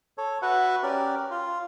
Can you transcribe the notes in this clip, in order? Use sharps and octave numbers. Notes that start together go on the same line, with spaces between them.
A4 C#5
F#4 B4 E5 F#5
C#4 G4 A#4 D5
F4